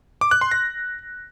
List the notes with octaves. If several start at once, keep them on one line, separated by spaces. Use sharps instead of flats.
D6
F#6
C6
A#6